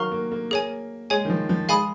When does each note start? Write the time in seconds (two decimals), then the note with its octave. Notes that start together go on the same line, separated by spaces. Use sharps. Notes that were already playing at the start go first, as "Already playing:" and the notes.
Already playing: D#3 F#3 A#4 F5 A#5 C#6 F6
0.11 A#3
0.32 A#3
0.51 A#3 G#4 C#5 G#5
1.10 G#3 G#4 C#5 G#5
1.25 D#3
1.30 F3
1.49 F3
1.69 G#3 F5 G#5 B5 D#6